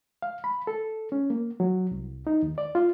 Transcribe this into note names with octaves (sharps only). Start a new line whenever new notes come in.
F5
B5
A4
C#4
A#3
F#3
C2
D#4
D#2
D5
F4